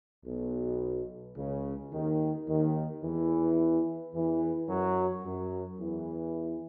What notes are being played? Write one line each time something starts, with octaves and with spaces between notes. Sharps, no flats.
B1 B2
C#2 C#3
D#2 D#3
D#2 D#3
E2 E3
E2 E3
F#2 F#3
F#2 F#3
E2 E3